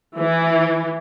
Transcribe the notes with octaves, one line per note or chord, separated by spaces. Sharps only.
E3